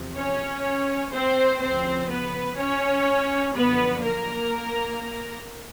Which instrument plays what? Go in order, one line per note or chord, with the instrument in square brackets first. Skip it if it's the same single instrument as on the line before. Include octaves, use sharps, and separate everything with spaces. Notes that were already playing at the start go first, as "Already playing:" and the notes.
Already playing: [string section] E2 C3 F3
C#4 C#5
C4 C5
D2 C#3 F3 C4 C5
B3 B4
C#4 C#5
F#2 D3 F3 B3 B4
A#3 A#4